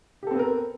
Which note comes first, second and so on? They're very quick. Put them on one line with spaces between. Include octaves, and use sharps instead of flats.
G4 A4 C4 B3 A#4